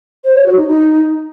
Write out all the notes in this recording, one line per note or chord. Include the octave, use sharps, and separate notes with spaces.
C5
C#5
F#4
D#4
D#4